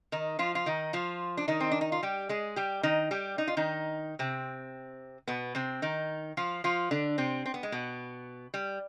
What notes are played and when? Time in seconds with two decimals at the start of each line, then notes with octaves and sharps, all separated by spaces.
0.12 D#3 D#4
0.39 F3 F4
0.55 F4
0.66 D#3 D#4
0.93 F3 F4
1.37 D4
1.48 D#3 D#4
1.60 C4
1.71 D4
1.81 D#4
1.92 F4
2.03 G3 G4
2.29 G#3 G#4
2.56 G3 G4
2.83 D#3 D#4
3.11 G3 G4
3.38 D#4
3.48 F4
3.57 D#3 D#4
4.19 C3 C4
5.27 B2 B3
5.55 C3 C4
5.82 D#3 D#4
6.37 F3 F4
6.64 F3 F4
6.91 D3 D4
7.18 C3 C4
7.46 C4
7.54 B3
7.63 G#3
7.72 B2 B3
8.54 G3